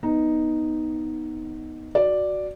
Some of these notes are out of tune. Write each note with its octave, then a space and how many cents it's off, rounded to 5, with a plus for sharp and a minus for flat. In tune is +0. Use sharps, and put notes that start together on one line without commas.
B3 +0 D#4 +0
F#4 +0 D5 +0